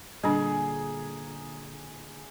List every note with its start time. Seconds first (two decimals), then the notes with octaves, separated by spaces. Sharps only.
0.24 A#2 D3 G3 D4 G#4 A#5